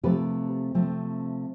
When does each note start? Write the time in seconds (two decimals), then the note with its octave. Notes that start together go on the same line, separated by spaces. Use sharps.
0.03 C3 F3 A3 C4 G4 B4
0.74 C3 F3 A3 C4